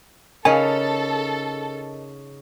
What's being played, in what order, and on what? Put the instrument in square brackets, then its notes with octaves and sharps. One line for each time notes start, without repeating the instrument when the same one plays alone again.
[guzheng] C#3 D#4 [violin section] A4 [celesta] A#4 D#5 [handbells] G#5